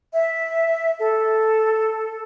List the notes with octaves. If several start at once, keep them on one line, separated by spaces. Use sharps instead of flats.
E5
A4